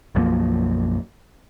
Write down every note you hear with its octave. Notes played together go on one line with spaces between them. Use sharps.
B1 F#2 F3 A#3